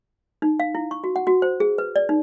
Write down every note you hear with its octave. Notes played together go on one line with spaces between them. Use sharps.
D#4
F5
E4
C#6
F#4
F#5
F#4
C5
G#4
B4
D5
D#4